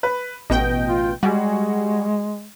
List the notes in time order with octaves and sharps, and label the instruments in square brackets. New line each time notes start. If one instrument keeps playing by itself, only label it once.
[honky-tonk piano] B4
[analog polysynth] A1 B2 G5 [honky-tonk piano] D#5
[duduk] F4
[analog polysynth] G3 [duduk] G#3 [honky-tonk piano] F#4 G#4